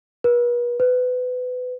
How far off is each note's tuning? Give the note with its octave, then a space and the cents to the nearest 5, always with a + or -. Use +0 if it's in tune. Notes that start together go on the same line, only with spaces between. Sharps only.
B4 -40
B4 +25